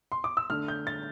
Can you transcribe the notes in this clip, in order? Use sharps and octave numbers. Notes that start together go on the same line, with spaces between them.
C6
D6
E6
D3 A3 D4 F6
G6
A6